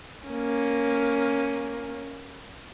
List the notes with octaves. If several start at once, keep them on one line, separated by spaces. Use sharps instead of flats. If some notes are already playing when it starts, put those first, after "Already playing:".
A#3 C#4